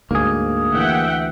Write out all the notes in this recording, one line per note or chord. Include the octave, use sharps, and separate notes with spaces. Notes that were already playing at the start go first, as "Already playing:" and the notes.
D2 G#2 A#3 G#4
D2 D#3 E3 E5 F#5 G5